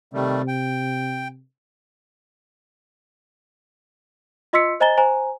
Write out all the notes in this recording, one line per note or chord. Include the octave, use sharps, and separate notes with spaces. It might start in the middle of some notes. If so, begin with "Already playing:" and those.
C3 D#3 G3 A3
G5
F4 D#5 C6 E6 B6 C#7
C5 D#5 G#5 A#5 A6 G7
C5 G#5 A#5